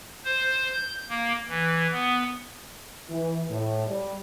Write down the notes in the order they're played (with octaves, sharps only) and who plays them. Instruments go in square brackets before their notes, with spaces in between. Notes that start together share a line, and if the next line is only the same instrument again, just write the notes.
[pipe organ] C5
G6
A#3
E3
B3
[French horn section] E3
A2
G3